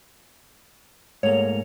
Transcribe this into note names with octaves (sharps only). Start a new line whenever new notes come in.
G#2 A3 A#3 C#5 F7